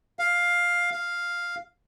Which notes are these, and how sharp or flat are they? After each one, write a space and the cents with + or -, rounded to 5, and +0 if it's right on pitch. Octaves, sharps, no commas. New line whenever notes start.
F5 +10
F5 +0